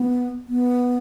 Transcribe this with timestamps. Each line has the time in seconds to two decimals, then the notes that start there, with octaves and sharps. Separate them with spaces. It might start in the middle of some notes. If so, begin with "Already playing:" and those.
Already playing: B3
0.48 B3